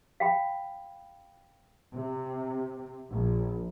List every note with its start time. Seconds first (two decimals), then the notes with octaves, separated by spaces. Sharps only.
0.20 F5 G5 B5
1.94 C3
3.11 A#1